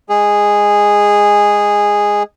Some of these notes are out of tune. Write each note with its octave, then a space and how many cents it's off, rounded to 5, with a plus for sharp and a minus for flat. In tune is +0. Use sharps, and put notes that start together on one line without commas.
G#3 -10 G#4 -10